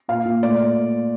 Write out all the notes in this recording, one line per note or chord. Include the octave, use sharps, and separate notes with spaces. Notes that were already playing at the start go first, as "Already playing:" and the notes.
A#2 F5
A#2
A3 D5